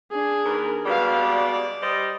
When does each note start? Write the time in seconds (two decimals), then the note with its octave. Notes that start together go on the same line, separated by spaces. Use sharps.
0.11 D4 G#4
0.44 D#2 A#4 B4
0.85 B2 G3 G#3 B4 F5
1.18 D5
1.81 G3 C5 D#5